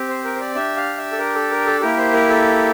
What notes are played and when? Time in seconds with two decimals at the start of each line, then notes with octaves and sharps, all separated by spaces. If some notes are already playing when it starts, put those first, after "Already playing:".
Already playing: C4 G4
0.09 C5
0.24 A#4
0.36 C5
0.40 D5
0.55 D4 G4 E5
0.76 F5
0.97 E5
1.12 A4
1.18 A#4
1.35 A4
1.51 A#4
1.66 A4
1.81 A#3 E4 G4 A#4
1.97 C5
2.13 A#4
2.29 A4